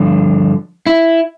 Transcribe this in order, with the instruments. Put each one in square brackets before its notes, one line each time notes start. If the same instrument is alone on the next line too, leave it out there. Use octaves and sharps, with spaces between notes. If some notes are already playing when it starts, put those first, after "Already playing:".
Already playing: [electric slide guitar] G2 D3 F3
E4